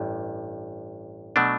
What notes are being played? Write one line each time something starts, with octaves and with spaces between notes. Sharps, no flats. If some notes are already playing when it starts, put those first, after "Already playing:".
Already playing: A1 G2
B2 F#3 A3 D4